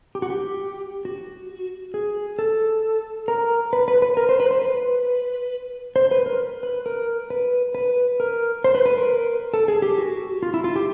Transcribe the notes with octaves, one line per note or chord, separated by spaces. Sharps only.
G4
F#4
G4
F#4
G#4
A4
A#4
B4
B4
B4
A#4
C5
B4
C5
B4
C5
B4
A#4
B4
A#4
B4
B4
A#4
C5
B4
B4
A#4
A4
G#4
G4
F#4
F4
E4
F4
G4